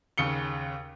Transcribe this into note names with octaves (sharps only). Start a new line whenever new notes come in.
D#2 C#3 C#7 G7